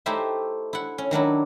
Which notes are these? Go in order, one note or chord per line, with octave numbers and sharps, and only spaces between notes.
A3 D#4 E4 G4 C5 E5
E4 F#5
C#4
D#3 F#3 D4 E4